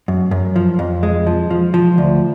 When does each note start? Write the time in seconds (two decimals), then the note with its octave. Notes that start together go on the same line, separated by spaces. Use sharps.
0.08 F#2
0.31 F#2
0.56 F3
0.79 F2
1.03 G#3
1.27 F3
1.51 F3
1.74 F3
1.98 D2